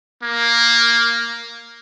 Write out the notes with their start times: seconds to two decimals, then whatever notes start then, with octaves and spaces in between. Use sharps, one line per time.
0.23 A#3